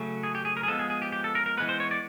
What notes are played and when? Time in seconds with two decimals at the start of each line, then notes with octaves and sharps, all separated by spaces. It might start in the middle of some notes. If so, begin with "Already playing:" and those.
Already playing: C#3 F#3 A3 C#4
0.23 G#4
0.35 G4
0.45 G#4
0.57 A#4
0.63 G#4
0.68 F3 G#3 B3 A4
0.79 G#4
0.90 G#4
1.02 G4
1.12 G4
1.24 A4
1.35 A#4
1.46 A#4
1.57 E3 G#3 B3 B4
1.69 C5
1.80 C#5
1.91 D5